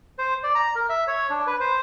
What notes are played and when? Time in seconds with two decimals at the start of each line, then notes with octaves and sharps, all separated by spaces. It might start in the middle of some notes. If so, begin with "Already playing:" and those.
0.19 C5
0.43 D5
0.55 A#5
0.76 A#4
0.89 E5
1.07 C#5
1.30 D4
1.47 B4
1.60 C5